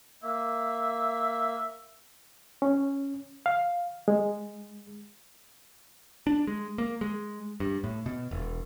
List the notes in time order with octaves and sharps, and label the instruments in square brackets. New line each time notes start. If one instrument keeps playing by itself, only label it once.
[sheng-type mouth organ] A#3 [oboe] E5
[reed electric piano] C#4
F5
G#3
[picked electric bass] D4
G#3
A#3
G#3
G2
A2
B2
E1